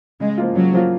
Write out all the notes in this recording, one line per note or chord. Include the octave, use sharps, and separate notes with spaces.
C#3 G#3
F3 A#3 F4
C#3 F#3
F3 A#3 F4